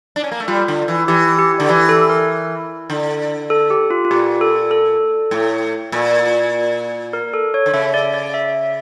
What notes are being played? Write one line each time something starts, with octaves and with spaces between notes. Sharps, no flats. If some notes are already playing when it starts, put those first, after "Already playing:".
D4
C#4
A#3
A3
G3 F4
D3
E3
E3 G4
G4
D3
E3 G4
A4
A#4
D3
A4
G4
F4
F4
A#2 G4
A4
A4
A2
A#2
A#4
A4
C#5
D3
C#3 E5
D5
D5
E5